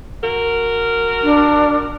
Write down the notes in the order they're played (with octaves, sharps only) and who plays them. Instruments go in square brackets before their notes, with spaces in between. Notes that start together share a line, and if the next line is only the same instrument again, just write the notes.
[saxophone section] F#4 A#4
[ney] D4